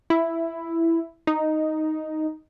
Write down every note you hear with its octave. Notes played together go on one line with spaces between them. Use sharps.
E4
D#4